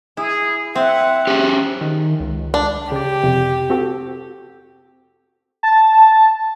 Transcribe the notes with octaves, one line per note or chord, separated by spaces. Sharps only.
E4 G#4
C4 E5 F#5
C#4 G4 G#4
D#3
C#2
D4
C#3 G4 D5
F2 C3
C4 F#4 A4
A5